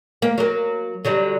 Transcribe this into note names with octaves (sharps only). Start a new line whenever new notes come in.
A#3
F#3 A#3
D3 F#3 G3